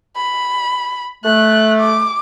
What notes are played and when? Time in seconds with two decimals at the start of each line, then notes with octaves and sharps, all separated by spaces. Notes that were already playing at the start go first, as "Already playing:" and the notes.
0.16 B5
1.25 A3 F#6
1.80 D6